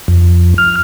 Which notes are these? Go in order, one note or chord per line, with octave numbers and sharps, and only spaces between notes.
F2
F6